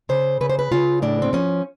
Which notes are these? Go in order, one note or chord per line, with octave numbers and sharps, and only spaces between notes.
C#3 C5
C#3 B4
C5
B4
C#3 F4
A2 D4
C4
F3 C#4